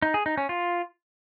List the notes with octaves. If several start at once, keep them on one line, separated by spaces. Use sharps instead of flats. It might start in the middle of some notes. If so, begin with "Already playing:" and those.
D#4
G#4
D#4
C#4
F4